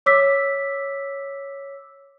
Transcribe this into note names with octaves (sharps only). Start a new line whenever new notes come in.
C#5 D6 E6 B6